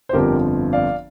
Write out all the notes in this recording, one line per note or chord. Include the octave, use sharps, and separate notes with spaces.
C5
G1 F2 D3 F3 G4 A#4
D5 F5